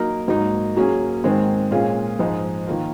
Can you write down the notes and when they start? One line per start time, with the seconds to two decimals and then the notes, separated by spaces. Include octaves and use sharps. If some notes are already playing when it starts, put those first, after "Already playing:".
Already playing: F#3 A#3 D#4 A#4
0.28 G#2 F#3 A#3 D#4
0.77 F#3 A#3 C#4 G#4
1.24 G#2 D#3 G#3 C4
1.71 A#2 G#3 C#4 F4 G#4
2.19 G#2 F3 G#3 D#4
2.67 D#3 A#3 F4